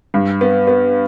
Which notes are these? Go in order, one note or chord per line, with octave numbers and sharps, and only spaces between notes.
G2
B3
B3